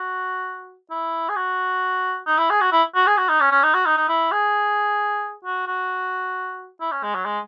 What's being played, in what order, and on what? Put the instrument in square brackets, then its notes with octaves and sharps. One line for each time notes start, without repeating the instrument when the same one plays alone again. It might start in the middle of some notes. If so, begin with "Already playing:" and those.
Already playing: [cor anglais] F#4
E4
G#4
F#4
D#4
E4
G#4
F#4
E4
F#4
G#4
F#4
D#4
C#4
C#4
D#4
F#4
D#4
D#4
E4
G#4
F#4
F#4
E4
C#4
G#3
F#3
G#3